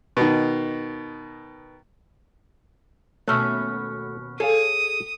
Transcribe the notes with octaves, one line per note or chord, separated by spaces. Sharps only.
B2 D#3
D#2 B2 A3 C#4 E5 C#6 F6 F#6
G#4 A4 C#5 F5 D#6